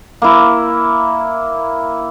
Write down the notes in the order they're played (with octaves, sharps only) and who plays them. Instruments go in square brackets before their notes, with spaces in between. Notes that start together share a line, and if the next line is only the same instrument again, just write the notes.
[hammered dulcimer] A#3 E4